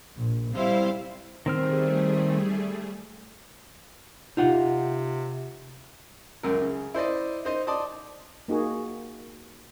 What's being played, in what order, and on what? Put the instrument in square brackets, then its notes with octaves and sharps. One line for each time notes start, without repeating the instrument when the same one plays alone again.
[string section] A#1
G3 C4 E4 C5 F5
[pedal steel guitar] D#3 C4 F6 [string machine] G3 A3 G#4
[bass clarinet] C3 [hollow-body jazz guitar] D#4 F4 F#5
[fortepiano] C#2 F#2 A#4
C#3
E4 C5 D5 D#5
D#4 C5 D#5
D5 D#5 A5 C6 D6 D#6
[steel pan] A#3 D#4 F#4 G#4